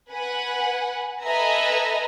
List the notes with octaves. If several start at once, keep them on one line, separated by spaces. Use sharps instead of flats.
B4 F#5 G#5
A4 B4 D#5 E5 G#5 A#5